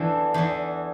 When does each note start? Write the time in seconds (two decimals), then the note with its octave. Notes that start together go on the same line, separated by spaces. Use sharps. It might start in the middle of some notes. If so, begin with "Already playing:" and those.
Already playing: E2 E3 D4 E4 F#4 A4
0.34 E2 E3